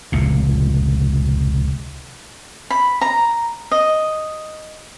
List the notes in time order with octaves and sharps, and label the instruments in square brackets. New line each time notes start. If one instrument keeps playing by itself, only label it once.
[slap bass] F1 C#2 A#2
[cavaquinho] B5
A#5
D#5